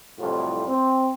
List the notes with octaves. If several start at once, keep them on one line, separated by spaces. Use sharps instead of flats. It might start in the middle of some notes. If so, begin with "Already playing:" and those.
C2 F2 A2 F#3 G3 F4
C4